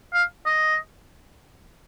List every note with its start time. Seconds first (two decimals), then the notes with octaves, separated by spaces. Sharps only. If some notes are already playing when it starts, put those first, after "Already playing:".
0.13 F5
0.46 D#5